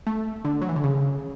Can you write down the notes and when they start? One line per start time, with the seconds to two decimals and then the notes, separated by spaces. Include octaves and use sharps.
0.07 A3
0.45 D3
0.62 F#3
0.69 E3
0.76 D3
0.84 C#3